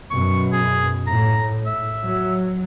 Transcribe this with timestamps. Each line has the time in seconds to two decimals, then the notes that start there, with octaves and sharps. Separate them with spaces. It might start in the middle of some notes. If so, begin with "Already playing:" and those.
0.11 F#2 B2 C#6
0.53 G#4
1.07 A2 A#5
1.66 E5
2.04 F#3